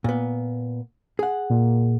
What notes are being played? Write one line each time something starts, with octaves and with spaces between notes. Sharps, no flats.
A#2 B3
G#4 F#5
A#2